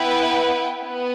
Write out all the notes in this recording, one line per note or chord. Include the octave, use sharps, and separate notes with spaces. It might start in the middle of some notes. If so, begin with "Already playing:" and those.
Already playing: B3 E4 B4 G5
B3